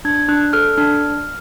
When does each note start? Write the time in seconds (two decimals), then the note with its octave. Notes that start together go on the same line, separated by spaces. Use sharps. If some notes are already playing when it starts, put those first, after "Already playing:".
0.05 D4 G#6
0.28 D4 F#6
0.53 A4 F6
0.78 D4 F6